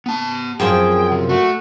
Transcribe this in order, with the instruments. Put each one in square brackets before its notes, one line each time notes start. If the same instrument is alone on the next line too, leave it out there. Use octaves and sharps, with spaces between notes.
[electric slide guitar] B3 A5
[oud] F#2 F3 C4 [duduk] G#4 [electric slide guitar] G5
[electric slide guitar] C3
[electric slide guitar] A3 [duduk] F#4